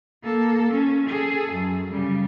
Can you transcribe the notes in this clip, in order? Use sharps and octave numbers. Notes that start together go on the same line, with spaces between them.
A#3 A4
C#4
G#4 A4
F#2
C#3 G3